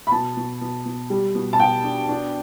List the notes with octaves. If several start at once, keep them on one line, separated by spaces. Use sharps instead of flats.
B5
B2 A5
B2
B2
B2
G3
B2
A5
B2 G5
D4
D4